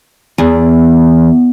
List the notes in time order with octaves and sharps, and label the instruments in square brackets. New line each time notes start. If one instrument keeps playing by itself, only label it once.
[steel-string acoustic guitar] E2